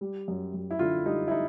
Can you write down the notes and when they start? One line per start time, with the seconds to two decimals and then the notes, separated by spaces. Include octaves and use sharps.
0.01 G3
0.28 F#2
0.54 F#2
0.71 E4
0.79 D3 F4
1.06 G3 D#4
1.28 E4
1.31 D#4